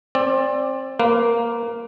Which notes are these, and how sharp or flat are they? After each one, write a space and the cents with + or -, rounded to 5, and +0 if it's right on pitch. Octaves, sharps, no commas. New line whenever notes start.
C4 +25 D5 +0
A#3 +0 B4 +35 F5 +0